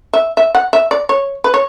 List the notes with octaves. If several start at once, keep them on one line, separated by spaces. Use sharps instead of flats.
E5
E5
F#5
E5
D5
C#5
B4
C#5